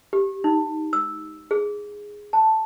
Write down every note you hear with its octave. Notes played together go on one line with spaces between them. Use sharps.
G4
D#4
E6
G#4
A5